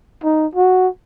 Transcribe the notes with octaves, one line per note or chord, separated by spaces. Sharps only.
D#4
F#4